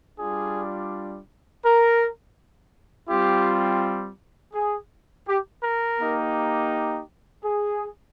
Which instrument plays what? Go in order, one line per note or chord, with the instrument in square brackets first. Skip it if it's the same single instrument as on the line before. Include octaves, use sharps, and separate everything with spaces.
[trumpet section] G3 D4 F4 G#4
A#4
G3 C4 F4 G4
G#4
G4
A#4
A#3 D#4 G4
G#4